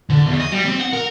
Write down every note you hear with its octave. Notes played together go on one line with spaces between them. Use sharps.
D3
E2
D#5
G3
C4
F#5
A#4